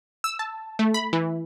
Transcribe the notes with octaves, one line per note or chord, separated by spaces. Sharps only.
E6
A5
A3
B5
E3